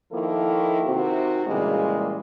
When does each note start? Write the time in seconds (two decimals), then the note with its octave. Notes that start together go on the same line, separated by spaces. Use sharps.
0.12 D#3 F3 A#3 E4 A4
0.86 C3 D#3 C4 F#4
1.47 A#2 C#3 E3 G3 G#3